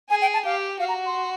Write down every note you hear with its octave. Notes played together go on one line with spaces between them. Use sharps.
G#4 G#5
G5
A5
G4 F5
F#4 F5
A#5
C6